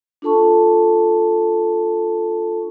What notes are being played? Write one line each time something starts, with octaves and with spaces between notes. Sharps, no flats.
D4 F4 A4 A5 C#6